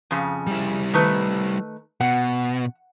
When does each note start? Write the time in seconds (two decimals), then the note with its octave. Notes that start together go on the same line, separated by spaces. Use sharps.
0.11 F2 C#3
0.47 G3 E4
0.93 D#3 A3 B4
2.01 B2 F#5